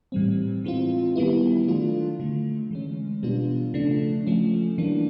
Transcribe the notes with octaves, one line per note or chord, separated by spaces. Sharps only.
A2 E3 G3 C4
E3 G#3 C4 F4
D#3 G3 B3 E4
D#3 F#3 A3 D4 F4
D3 F#3 A3
E3 G#3 C#4
B2 G3 B3 D4 F4
C#3 F3 A3 D4
F3 A3 C#4
E3 G3 A#3 D4